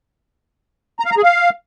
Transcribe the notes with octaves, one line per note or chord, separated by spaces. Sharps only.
A#5
F5
A#5
G#4
F5